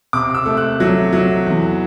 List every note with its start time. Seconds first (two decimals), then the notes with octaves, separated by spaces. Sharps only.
0.13 C3 D6
0.34 E6
0.46 A3
0.57 F#6
0.80 F#3
1.13 F#3
1.46 E2